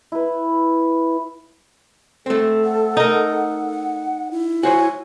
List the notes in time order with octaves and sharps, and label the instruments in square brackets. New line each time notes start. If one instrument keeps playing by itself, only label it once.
[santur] E4 B4
[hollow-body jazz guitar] A3 C4 [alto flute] A4
[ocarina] F#5
[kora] D#4 A#4
[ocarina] E4
[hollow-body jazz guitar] F#4 C5 C#5 [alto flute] G#5